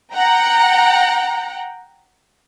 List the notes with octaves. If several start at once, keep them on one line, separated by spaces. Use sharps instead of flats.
F#5 G5 A#5